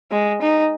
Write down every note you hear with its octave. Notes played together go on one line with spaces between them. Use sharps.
G#3
D#4